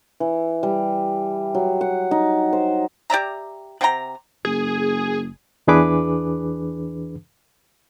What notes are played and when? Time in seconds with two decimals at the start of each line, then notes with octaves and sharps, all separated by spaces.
0.20 E3
0.63 G3
1.55 F#3
1.81 F#5
2.11 D#4
2.53 C5
3.10 G4 D5 E5 A#5
3.81 C3 F#5 G5 A#5
4.45 F#1 G#4
5.67 E2 E3 D4 G#4 B4 D6